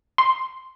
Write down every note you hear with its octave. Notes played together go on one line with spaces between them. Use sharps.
C6